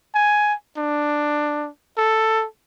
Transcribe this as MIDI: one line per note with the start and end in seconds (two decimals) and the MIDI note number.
0.14 0.54 80
0.77 1.69 62
1.97 2.45 69